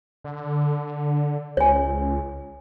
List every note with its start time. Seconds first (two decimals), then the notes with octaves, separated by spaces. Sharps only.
0.24 D3
1.57 C#2 C#5 G#5